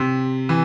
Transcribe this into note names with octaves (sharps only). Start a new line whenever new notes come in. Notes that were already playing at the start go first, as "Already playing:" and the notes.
Already playing: C3
E3